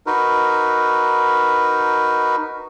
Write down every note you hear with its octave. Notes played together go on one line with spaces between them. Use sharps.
D#4 F#4 A#4 B4